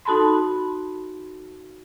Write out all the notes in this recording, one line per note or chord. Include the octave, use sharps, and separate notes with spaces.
D#4 F#4 A4 A5 B5 C6